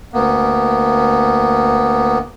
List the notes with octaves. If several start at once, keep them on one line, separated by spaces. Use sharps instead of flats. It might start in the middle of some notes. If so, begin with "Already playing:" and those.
D2 A#3 B3